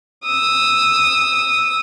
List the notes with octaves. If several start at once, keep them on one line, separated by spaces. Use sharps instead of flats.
D#6 E6